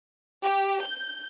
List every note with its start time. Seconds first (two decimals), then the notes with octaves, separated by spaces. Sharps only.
0.43 G4
0.83 G6